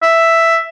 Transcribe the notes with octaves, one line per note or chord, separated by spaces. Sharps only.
E5